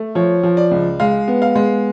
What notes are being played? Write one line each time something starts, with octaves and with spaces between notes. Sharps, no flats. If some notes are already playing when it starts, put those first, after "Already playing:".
Already playing: A3
F3 C#5
F3
D5
C#2
G#3 F5
B3
F5
G#3